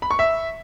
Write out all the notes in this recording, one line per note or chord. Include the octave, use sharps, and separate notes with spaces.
B5
C#6
E5